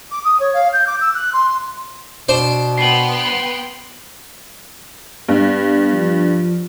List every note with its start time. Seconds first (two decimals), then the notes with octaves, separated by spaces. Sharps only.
0.11 D6
0.24 D#6
0.40 C#5
0.53 F5
0.73 G6
0.87 D6
1.01 E6
1.14 F#6
1.33 C6
2.29 B2 D4 C5
2.78 B3 G5 C6 C7 F#7
5.29 G2 B3
5.94 F3